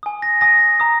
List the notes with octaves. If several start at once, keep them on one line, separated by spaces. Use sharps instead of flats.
G#5 D#6
A#6
G#5 D#6 A#6
A#5 D#6